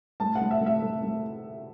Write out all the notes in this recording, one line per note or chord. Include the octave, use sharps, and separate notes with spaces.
A2 A5
F#5
A2
E5
A3
E5
A3
A3